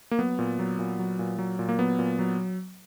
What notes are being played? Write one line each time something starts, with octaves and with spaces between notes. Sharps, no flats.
A#3
F#3 B3
A#2
F#3
A#2
F#3
A#2
F#3
A#2
A#3
F#3 B3
A#2
F#3